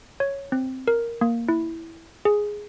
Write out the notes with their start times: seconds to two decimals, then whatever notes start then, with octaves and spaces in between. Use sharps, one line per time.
0.20 C#5
0.52 C4
0.88 A#4
1.21 A#3
1.49 E4
2.25 G#4